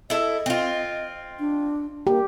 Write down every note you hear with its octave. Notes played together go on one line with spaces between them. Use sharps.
E4 A4 D#5
C4 F4
D4
A#3 G4